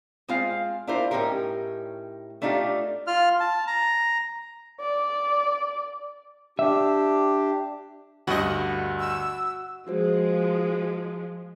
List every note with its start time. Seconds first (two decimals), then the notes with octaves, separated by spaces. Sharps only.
0.28 G#3 C4 F4 C5 F5
0.87 D4 E4 F4 A#4 C5
1.11 A2 F3 C#4 D#4 G4 A#4
2.42 A3 D4 D#4 F4 G4
3.07 F4 F6
3.40 A5
3.67 A#5
4.80 D5
6.59 D4 G4 E5
8.27 D2 G2 F#4 D#5
9.00 E6
9.87 F3 G#3 F4 F#4 C5